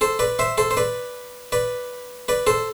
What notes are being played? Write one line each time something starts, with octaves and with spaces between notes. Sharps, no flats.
A4 C5
B4 D5
C5 E5
A4 C5
C5
B4 D5
B4 D5
B4 D5
A4 C5